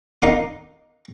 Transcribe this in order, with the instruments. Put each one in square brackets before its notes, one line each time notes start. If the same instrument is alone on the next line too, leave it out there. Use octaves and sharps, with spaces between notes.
[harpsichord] D#4 A#4 F5 D6